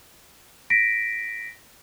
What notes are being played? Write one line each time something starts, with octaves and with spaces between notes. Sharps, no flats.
A#6 B6 D7